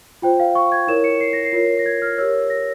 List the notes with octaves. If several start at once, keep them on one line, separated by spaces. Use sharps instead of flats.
F4 C5 G5
F5
C#6
G#6
E4 A#4 C#5 E7
C#7
C7
A#6
C7
F4 A#4 C#5
A#6
G#6
F6
G4 A#4 C#5 E6
A#6